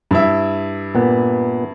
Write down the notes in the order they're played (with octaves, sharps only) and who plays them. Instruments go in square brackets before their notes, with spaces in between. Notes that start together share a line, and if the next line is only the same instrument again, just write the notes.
[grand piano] G2 E4 E5
[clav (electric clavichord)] A#2 B3